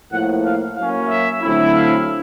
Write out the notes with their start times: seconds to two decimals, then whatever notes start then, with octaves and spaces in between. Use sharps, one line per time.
0.12 A2 F3 A#3 F#5
0.44 F5
0.77 F#3 A#3 C#4 F5
1.09 E5
1.42 D3 F#3 A3 C4 E4
1.75 F5